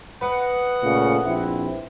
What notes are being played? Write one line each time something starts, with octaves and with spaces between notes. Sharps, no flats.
B4 D#5 F#5
A#2 C#3 A3
A#1 C4 E4